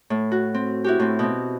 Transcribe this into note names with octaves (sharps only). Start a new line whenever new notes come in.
A2
F#4
C4
E4 F#4 G4
A2 C4
B2 C4